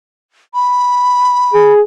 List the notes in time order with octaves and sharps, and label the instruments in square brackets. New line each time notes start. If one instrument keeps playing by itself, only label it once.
[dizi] B5
[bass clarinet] G#4